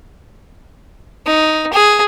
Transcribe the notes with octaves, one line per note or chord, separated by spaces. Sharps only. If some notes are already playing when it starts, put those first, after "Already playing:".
D#4
G#4